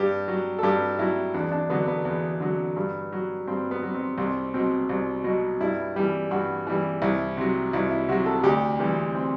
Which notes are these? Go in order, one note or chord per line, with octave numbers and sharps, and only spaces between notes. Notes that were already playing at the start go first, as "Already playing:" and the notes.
Already playing: G2 G4
F#3
A4
G2 G4
F#3 E4
E2 D4
D4
D3 F#3 B3
B3
E2
D3 F#3
G2
F#3
G2 C4
B3
F#3
C4
C2 C4
B2 F#3 C4
C2
B2 F#3
G2 E4
E3 G3
G2 F#4
E3 G3
C2 E4
C3 F#3
C2 E4
E4
C3 F#3 F#4
A4
D2 G4
C3 E3 G3
C4